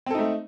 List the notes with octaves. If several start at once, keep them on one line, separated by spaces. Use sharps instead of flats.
A3 C4 D#4 A4